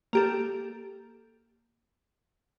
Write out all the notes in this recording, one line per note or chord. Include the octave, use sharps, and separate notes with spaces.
A#3 G4 A4